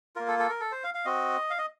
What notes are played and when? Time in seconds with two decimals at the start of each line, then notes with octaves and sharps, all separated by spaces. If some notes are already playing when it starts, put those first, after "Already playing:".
0.16 A#3 F4 A#4
0.28 A4
0.39 A4
0.49 A#4
0.60 A4
0.72 C5
0.84 F5
0.94 F5
1.05 C4 F#4 D#5
1.50 F5
1.58 D#5